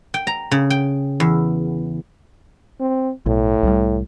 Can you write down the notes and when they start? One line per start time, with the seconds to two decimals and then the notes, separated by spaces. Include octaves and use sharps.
0.14 G5
0.27 A#5
0.51 C#3
0.70 G5
1.20 E2
2.80 C4
3.26 B1 A2
3.63 C2 F#3 G3